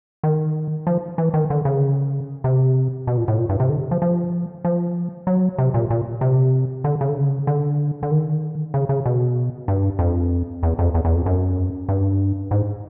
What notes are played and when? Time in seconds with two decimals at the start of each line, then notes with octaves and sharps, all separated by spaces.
0.24 D#3
0.87 F3
1.18 E3
1.34 D#3
1.50 D3
1.65 C#3
2.44 C3
3.07 B2
3.17 A#2
3.28 A2
3.38 A#2
3.49 G2
3.60 C3
3.69 D3
3.91 F3
4.02 F3
4.65 F3
5.27 F#3
5.58 C3
5.74 A#2
5.90 A#2
6.21 C3
6.84 D3
7.01 C#3
7.09 D3
7.18 C#3
7.47 D3
8.03 D3
8.11 D#3
8.74 C#3
8.89 C#3
9.06 B2
9.68 G2
9.99 F2
10.63 E2
10.79 F2
10.94 E2
11.05 E2
11.15 F2
11.26 F#2
11.89 G2
12.51 G#2